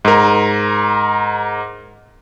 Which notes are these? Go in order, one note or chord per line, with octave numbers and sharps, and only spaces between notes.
G#2 A#4